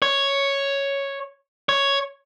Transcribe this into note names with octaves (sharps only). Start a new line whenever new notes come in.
C#5
C#5